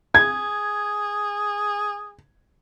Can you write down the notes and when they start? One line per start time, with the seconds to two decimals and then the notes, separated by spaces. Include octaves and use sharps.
0.15 G#4 G#6